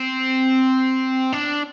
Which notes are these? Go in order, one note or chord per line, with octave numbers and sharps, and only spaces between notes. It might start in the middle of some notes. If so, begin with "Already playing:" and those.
Already playing: C4
D4